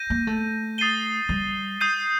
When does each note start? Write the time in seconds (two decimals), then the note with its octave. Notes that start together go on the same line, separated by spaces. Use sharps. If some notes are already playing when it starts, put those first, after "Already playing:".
Already playing: G6 A#6 D#7
0.10 A#3
0.27 A3
0.78 D#6 A6 C7 D#7 G7
1.29 G3
1.81 D#6 G6 C7 D#7